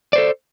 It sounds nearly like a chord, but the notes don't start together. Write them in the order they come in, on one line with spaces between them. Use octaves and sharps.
D5 C5 A4